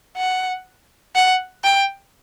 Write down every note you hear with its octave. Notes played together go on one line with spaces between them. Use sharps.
F#5
F#5
G5